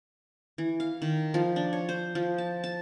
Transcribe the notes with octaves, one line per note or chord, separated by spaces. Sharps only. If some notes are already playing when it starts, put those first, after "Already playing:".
E3
F5
D#3
F3
D4
C#5
C5
F3
A5
A5